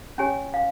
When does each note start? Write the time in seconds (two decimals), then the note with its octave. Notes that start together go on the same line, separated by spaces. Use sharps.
0.18 C#4 G4 C#5 G#5
0.54 F5